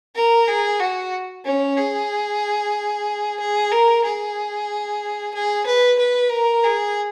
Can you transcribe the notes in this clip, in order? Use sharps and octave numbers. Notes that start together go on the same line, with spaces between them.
A#4
G#4
F#4
C#4
G#4
G#4
A#4
G#4
G#4
B4
B4
A#4
G#4